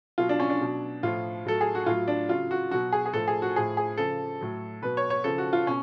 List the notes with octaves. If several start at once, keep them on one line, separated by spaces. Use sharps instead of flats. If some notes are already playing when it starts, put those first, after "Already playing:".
B2 F#3 F4
D4
C#4
D4
B2 F#3
A2 F3 F4
A2 F#3 A4
G#4
F#4
A2 F#3 F4
D4
C#3 F#3 F4
F#4
B2 F#3 F#4
G#4
G#4
A2 F3 A4
G#4
F#4
A2 F3 G#4
G#4
C#3 F3 A4
A2 F#3
B2 F#3 B4
C#5
C#5
C#3 F3 A4
F#4
F4
B2 C#4